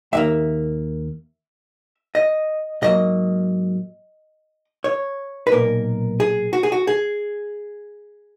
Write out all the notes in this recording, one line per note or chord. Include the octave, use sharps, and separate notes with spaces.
D#2 D#3 A#3 E5
D#5
G#2 F#3 A#3 D#5
C#5
B4
B1 A#2 A#3 A#4
G#4
F#4
G#4
F#4
G#4